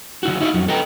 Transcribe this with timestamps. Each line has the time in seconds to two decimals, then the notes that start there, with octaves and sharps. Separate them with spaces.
0.23 C#3 E4 F#4
0.40 D#4 E4 F#4 C5 E5 F5
0.54 F2 F#3
0.68 A4 B4 D#5 G5 A#5